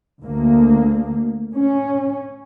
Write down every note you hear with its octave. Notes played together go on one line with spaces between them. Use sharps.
D2 A#3
C#4